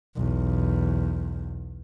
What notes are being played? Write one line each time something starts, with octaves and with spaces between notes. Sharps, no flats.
B1 E2